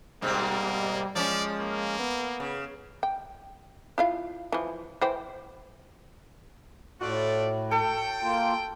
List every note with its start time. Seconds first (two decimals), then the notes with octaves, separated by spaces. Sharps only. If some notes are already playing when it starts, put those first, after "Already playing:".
0.22 G#2 B2 G3 A#3 C4
1.15 F3 G#3 C#4 D5
1.60 A#3
1.99 B3
2.40 C#3
3.03 G5
3.98 E4 F4 F5
4.52 E3 F3
5.01 E3 C5 G5
7.01 A2 A3 F4 F#4 D5
7.71 A4 G5
8.22 A#3 F4